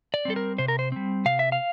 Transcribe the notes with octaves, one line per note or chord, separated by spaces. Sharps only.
D5
G3 C4 A4
A#4
C3 C5
A#4
C5
G3 C4
C3 F5
E5
F5